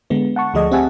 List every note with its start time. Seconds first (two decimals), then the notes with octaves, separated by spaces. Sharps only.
0.10 D3 G#3 B3
0.36 F#5 A5 C#6
0.54 D2 F3 A3 G#4 D5 D#5
0.71 C4 G4 E5 F#5 G#5 A5